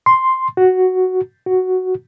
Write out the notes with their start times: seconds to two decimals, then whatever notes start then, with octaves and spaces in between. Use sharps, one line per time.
0.06 C6
0.57 F#4
1.46 F#4